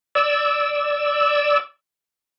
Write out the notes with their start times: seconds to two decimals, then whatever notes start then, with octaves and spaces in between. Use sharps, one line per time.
0.15 D5 E6